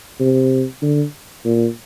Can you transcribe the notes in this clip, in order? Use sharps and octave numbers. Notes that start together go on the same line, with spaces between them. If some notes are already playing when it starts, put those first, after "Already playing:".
C3
D3
A#2